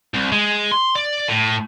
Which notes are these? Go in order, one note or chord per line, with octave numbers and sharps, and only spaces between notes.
C2
G#3
C6
D5
A2